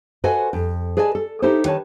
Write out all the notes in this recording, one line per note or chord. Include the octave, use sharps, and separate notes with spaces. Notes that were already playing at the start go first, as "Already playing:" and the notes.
F#4 A4 B4 C5 D#5 G#5
F2
G#4 B4 D5 D#5 G#5 A5
A4
D#4 E4 G4 A4 C5
D#3 B4 C#5 A5